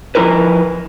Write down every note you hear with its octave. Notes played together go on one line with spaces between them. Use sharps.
F3 G3 E4 A#4 B4